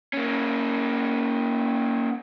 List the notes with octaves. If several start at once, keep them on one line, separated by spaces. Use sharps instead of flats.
A#3 C#4